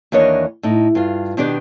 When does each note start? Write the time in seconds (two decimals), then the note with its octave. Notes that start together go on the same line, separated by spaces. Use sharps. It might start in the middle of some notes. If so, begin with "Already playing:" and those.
0.12 D#2 E3 D4 A#4 C#5 D#5
0.63 A2 D#4
0.95 G2 F4
1.37 B2 D#3 B3 D4 G4 D5